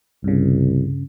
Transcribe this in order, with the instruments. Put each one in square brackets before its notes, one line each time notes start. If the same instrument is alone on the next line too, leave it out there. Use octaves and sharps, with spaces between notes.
[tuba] C2 [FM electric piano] G2 C#3